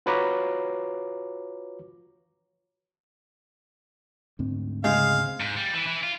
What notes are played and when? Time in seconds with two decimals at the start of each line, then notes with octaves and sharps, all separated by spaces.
0.06 F4 F#4 B4 C#5 A#5 D6
4.39 D2 G#2 C4
4.84 C#3 G#3 C5 F5
5.40 G#2
5.57 G3
5.74 E3
5.86 E3
6.03 F4